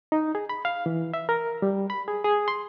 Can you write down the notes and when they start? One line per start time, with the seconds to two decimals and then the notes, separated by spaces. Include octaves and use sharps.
0.12 D#4
0.35 G#4
0.49 B5
0.65 F5
0.86 E3
1.14 E5
1.29 A#4
1.62 G3
1.90 B5
2.08 G#4
2.24 G#4
2.48 C6